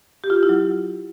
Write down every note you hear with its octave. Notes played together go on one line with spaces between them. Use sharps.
G4
F4
G4
E4
F#3